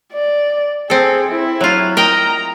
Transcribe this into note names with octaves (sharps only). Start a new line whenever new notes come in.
D5
C4 G#4 A4
E4
F#3 F4
A#4 D#5 G5 A#5